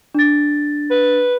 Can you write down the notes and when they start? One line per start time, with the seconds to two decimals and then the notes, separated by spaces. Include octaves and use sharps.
0.14 D4 A6
0.91 B4